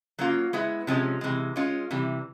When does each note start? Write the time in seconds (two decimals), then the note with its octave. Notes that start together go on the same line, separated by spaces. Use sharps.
0.19 F#3 A#3 C#4 F4
0.53 G#3 B3 E4
0.87 C3 F3 G#3 C#4
1.21 C3 E3 G#3
1.56 G#3 C#4 F4
1.91 C3 E3 G3